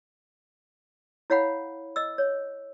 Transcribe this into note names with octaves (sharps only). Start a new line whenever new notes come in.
E4 C#5 F5 F#5 B5
D#5 E6
C#5